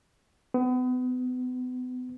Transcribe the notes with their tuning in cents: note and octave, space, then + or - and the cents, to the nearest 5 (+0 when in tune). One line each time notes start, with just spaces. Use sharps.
B3 +35